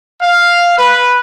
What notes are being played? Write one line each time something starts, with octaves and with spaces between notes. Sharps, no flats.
F5
B4